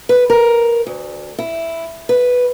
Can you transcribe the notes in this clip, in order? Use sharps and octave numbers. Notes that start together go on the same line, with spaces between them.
B4
A#4
D2
E4
B4